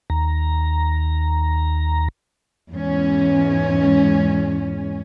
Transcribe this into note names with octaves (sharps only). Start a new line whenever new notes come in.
D#2 A#5
E2 G#2 C#4